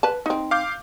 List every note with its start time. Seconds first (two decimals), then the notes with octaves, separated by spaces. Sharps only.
0.03 B4 A5
0.26 C4 D#4
0.51 F5 D6 G6